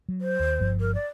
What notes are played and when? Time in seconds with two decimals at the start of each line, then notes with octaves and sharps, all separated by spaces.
0.08 F#3
0.21 C5
0.39 D#2
0.60 G1 G2 F3
0.80 A#4
0.95 D5